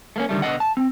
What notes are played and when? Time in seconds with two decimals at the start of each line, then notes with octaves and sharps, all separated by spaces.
0.16 A3 A#3 C#4
0.29 D3 D#3 G3 A3
0.42 B2 D3 F#4 D#5 F#5
0.60 A5
0.77 C4